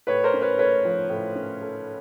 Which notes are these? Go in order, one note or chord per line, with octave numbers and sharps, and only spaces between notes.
A2 B4 C#5
A#4 C5
C#4
B4 C#5
A3 B4 C#5
F3
A2
C#4
A3